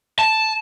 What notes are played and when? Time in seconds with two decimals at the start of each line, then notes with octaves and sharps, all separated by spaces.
0.19 A5